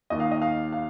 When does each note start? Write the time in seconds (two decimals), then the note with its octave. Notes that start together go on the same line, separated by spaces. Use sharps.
0.10 D#2 D#3 D#5
0.20 F5
0.32 D#5
0.42 F5
0.72 F5